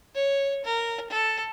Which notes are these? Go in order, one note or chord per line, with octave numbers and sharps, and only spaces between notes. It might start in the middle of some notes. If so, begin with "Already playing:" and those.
C#5
A#4
A4